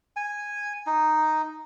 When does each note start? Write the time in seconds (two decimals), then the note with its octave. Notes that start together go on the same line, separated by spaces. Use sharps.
0.16 G#5
0.87 D#4